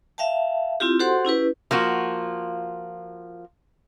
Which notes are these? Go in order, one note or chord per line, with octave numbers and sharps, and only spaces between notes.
E5 F5 G5 A5
C4 E4 F4 G4
F#4 G4 A4 C5 F#5 C6
C#4 E4 G4 B4
F3 A#3 F4 F#4